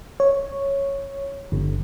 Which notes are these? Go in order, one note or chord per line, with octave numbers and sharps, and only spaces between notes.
C#5
G1